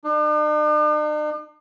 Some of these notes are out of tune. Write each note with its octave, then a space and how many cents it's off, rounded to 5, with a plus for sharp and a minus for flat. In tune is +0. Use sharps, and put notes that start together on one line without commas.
D4 +45